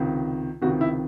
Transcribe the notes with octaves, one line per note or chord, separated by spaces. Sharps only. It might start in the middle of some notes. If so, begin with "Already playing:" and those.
Already playing: C#2 C3 D#3
C#2 C3 D#3 F#4
E4